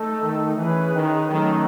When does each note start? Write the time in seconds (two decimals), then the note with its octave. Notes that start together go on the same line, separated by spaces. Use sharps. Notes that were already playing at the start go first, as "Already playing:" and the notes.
Already playing: A3 D#4 A4
0.22 D#3
0.57 E3 C#4 G#4 B4
0.94 D#3
1.30 D#3 F#3 A3 C#4 F#4 A4